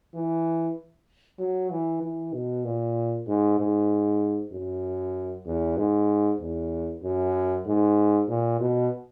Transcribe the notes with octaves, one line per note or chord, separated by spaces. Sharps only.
E3
F#3
E3
E3
B2
A#2
G#2
G#2
F#2
E2
G#2
E2
F#2
G#2
A#2
B2